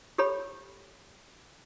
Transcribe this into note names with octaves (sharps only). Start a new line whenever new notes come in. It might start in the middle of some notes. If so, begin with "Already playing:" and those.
G4 A4 C#5 B5